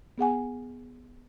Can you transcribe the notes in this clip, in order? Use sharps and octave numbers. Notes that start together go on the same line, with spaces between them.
B3 G#4 F#5 G#5